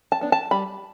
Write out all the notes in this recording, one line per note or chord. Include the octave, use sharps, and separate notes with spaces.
A5
B3 D4
A5
G3 B5